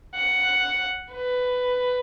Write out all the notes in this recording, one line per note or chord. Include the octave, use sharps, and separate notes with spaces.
F#5
B4